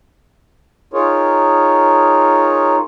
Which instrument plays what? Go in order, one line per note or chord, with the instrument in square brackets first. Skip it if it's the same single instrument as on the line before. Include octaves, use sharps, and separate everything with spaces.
[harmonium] D#4 F4 G#4 A#4 C#5